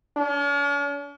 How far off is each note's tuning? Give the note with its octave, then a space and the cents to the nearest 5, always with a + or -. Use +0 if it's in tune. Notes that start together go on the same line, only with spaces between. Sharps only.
C#4 +45